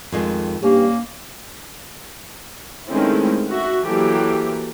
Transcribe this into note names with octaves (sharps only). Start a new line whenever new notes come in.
F2 D#3 G#3
G2 A#3 C#4 G4
D#3 G#3 A3 C4 C#4 E4
F#4 E5
E3 F#3 A#3 G4 A4